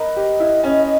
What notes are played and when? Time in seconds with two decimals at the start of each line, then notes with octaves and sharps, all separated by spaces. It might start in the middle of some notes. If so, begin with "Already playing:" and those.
Already playing: A#4 B4 D#5
0.16 G4
0.40 E4
0.64 C#4